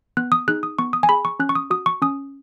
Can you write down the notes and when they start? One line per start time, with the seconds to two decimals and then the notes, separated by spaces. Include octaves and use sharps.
0.17 B3 F#6
0.32 D#6
0.48 D#4 G#4 F#6
0.63 D#6
0.79 B3 C#6
0.93 D#6
1.03 G#5
1.09 G#4 B5
1.25 C#6
1.39 C#4 F#6
1.49 C#6
1.55 D#6
1.70 F#4 D#6
1.86 C#6
2.02 C#4 D#6